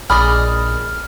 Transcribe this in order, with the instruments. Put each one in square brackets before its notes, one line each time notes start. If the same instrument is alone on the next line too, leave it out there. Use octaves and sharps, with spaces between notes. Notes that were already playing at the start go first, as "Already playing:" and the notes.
[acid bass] A#1 [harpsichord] G#4 D5 D#5 [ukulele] B5 [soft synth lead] F6